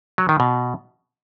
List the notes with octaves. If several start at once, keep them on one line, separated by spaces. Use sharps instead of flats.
F#3
D#3
B2